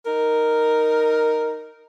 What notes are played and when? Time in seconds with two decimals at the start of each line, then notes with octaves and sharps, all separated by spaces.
0.05 D#4 A#4